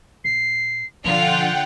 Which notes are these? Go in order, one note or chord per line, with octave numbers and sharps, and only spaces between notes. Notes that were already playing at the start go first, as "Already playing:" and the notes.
A#2 C7
B2 D3 F3 F4 F#5 G5 F7